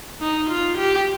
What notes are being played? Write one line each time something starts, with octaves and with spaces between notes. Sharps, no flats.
D#4
F4
G4